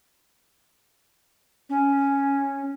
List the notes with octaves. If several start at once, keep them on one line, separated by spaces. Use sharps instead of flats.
C#4